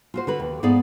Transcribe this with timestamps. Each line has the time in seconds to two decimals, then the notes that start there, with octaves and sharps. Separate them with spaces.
0.14 F4 F#4 C5
0.27 D3 F#4 B4
0.40 D#2
0.63 G#2 B3 G#4 D5 F5